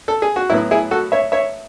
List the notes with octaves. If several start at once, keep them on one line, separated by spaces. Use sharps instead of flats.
A4
G#4
F#4
A2 F#3 B3 E4
E4 G#4
F#4 A4
C#5 E5
C#5 E5